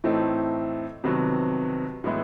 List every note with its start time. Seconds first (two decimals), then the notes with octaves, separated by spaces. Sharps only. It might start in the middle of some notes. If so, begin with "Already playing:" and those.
0.04 A2 E3 A3 C4 D#4
1.04 F2 C3 D#3 F#3 B3
2.04 A2 E3 G#3 B3 E4